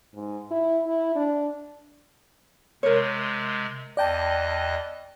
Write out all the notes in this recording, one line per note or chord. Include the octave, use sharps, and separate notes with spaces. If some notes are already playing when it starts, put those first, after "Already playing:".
G#2
E4
E4
D4
C3 G#3 A#4 C#5
E2 D5 D#5 G5 A5 F#6